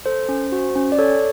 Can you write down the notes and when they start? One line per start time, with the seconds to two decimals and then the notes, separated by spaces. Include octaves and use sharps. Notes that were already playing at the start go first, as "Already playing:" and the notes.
0.06 A4 C5
0.29 C#4
0.52 F#4
0.76 C#4
0.92 D5
0.98 A4 C#5